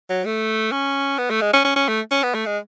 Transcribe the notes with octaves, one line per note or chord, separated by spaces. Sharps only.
F#3
A3
C#4
B3
A3
G#3
C#4
C#4
C#4
A3
C#4
B3
A3
G#3